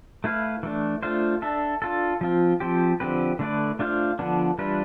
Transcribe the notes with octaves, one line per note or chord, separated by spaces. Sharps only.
A3 E4 B4 F5
E3 A3 D4
A3 D4 F4 C5 F5
D4 A4 E5
D4 F4 A4
F3 C4 F4
F3 C4 G4 C5
D3 F3 C4 G4 B4
D3 A3 E4 B4 D5
A3 D4 F4 C5 F5
D3 F3 B3 D4
E3 G3 D4 F4 B4